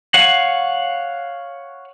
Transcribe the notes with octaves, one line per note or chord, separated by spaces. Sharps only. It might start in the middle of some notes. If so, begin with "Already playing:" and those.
C#5 F5 F#5